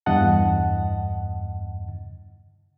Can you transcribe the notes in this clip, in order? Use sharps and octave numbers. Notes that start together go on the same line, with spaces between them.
E2 G2 D#5 F#5 A5